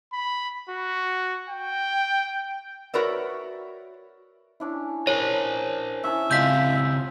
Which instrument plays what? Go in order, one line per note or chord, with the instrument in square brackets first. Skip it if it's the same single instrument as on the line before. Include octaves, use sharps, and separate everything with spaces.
[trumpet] B5
F#4
G5
[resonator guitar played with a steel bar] F#4 A#4 B4 C#5 D5 E5
[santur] C#4 D4 E4
[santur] G#4 A5 A#5 [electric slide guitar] A#4 C5 [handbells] C#5
[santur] C#4 E4 A5 [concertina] E5
[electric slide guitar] C#3 C4 E4 [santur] G#3 F4 [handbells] G6 B6